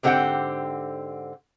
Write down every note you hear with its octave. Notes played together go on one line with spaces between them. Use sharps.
G#2 D3 C4 G4 F#5 G5